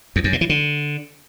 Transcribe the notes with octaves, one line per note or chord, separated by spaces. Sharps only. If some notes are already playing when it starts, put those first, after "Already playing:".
E2
F#2
A#2
E3
D3